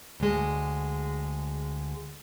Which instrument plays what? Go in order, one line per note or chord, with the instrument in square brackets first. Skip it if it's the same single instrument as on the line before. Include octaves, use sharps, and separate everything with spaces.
[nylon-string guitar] D2 G#3